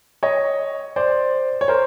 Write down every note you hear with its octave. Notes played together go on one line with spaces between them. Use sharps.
C#5 D#5
C5 D5
C#5
A#4 C5